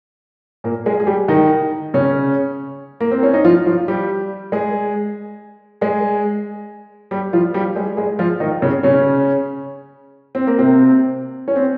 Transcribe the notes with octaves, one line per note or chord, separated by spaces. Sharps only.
A#2 A#3
G#3 G#4
G#4
G3 G4
D#3 D#4
C#3 C#4
A#3
C4
C#4
D#4
F3 F4
F3 F4
G3 G4
G#3 G#4
G#3 G#4
G3 G4
F3 F4
G3 G4
G#3 G#4
G#3 G#4
F3 F4
D#3 D#4
C#3 C#4
C#3 C#4
C4
A#3
C3 C4
C#4
C4